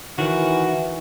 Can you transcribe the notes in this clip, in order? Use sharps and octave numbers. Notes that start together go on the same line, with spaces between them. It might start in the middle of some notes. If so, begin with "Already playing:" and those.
D#3 E3 F#4